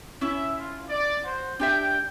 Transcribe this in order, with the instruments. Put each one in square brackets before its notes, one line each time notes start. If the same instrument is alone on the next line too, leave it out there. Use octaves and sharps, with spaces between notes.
[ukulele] C#4 E4 [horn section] E5
[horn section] F4
D5
F#4 C5
[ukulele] D4 G4 E5 [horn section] G5